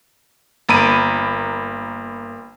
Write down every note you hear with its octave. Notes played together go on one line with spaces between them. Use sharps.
G1 A#3 A#5 B5 D7 D#7